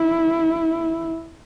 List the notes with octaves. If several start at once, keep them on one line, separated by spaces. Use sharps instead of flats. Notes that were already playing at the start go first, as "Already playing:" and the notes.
Already playing: E4